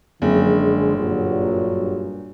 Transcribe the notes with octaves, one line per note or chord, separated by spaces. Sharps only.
F#1 D3 F3 G#3
G2 A#2 F#3